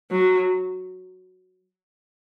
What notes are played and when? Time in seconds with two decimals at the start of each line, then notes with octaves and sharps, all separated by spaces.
0.11 F#3